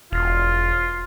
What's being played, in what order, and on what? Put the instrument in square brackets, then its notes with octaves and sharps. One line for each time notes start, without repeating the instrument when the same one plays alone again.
[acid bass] E1 [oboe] F4